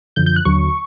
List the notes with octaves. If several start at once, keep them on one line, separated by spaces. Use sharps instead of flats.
F#2 D3 F3 G6
G6
F#6
D#2 D3 F#3 C#6